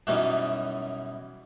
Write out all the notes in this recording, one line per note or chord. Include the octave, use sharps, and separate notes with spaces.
F#2 B2 E3 G3 C#4 D#4